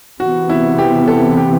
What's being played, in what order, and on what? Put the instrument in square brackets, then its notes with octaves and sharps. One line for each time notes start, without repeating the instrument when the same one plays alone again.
[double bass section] C3 E3 B3 [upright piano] F#4
[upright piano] E4
G4
A4
G4